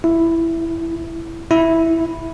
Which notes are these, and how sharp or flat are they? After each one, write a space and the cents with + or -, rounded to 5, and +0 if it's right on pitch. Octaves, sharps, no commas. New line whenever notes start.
E4 +5
E4 -5